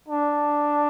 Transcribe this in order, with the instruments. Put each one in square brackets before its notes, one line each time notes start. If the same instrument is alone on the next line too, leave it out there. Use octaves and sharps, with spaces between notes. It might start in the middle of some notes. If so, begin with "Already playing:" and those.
[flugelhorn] D4